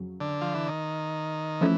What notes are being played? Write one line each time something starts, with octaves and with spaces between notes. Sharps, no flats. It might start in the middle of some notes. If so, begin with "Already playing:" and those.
Already playing: F2 C#3 F#3
D3
F3
E3
D#3
E3 F3 A3 C#4